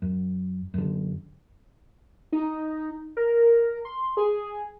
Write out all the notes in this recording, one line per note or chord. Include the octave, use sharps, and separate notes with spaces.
F#2
F#2 D3
D#4
A#4
C6
G#4